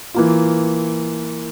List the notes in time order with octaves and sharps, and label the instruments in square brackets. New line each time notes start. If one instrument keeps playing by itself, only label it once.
[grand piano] E3 A#3 F4